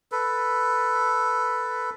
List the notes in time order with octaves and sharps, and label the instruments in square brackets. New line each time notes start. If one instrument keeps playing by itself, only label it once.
[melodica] A4 B4